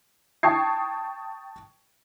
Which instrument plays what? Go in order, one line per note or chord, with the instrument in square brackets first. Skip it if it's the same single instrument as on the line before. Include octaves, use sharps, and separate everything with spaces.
[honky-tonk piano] G5 A5 C#6 D#6 G#6 C7